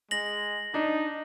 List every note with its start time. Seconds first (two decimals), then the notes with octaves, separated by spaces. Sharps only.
0.11 G#3 A#6 F#7
0.74 D4 D#4